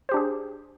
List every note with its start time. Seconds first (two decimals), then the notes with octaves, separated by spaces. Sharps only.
0.09 C5
0.12 G4
0.14 D4
0.17 G#4